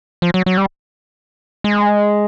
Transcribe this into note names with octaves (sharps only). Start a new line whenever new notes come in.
F3
F#3
F#3
G3
G#3